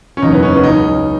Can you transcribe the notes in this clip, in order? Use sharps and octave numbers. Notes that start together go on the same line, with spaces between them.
C#4
F#1 E2 C#3 F#3 D#4
B3
C#4
B3
C#2 C#3 F#3 D#4